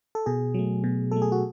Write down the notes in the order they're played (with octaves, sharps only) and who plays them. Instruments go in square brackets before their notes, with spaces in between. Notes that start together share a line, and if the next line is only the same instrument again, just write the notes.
[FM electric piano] A4
B2 G#4
F#3 A3
B2
F#3 A3 A4
G#4
F#4